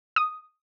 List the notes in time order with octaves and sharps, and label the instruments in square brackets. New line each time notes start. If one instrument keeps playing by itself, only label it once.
[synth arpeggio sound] D#6